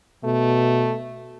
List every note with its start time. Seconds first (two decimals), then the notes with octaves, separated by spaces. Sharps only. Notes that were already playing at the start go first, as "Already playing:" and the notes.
0.25 B2 A3